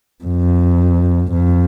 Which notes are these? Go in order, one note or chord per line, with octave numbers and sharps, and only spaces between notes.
F2
F2